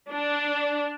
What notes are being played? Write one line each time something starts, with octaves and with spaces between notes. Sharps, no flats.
D4